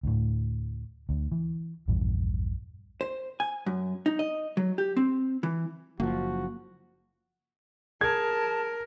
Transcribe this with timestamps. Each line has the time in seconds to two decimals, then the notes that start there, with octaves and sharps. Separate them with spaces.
0.03 D2 A2
1.09 D2
1.32 E3
1.88 A#1 E2 G2
3.01 C5
3.40 G#5
3.66 F#2
4.06 D#4
4.19 D#5
4.57 F#3
4.78 G4
4.97 C4
5.43 E3
6.00 F#1 F3 A#3 F#4
8.01 G#4 A#4 A5 G#6